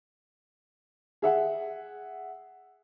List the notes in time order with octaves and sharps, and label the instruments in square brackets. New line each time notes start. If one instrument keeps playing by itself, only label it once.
[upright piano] G#4 E5 F#5